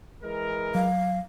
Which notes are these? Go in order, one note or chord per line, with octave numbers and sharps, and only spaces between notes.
E3 G#3 A#4
F#3 F5